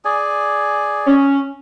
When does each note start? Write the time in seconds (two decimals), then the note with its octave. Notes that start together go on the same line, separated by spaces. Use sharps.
0.05 G#4 D5 G#5
1.06 C#4